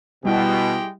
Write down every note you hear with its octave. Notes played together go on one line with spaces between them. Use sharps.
B2 G3 G#3 E4 G4 G5